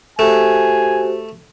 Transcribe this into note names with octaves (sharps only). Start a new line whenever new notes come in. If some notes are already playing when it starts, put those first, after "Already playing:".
A3 F#4 G4 C5 G#5